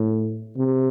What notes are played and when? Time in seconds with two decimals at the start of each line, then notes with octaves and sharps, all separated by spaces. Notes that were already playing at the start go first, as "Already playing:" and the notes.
Already playing: A2
0.57 C3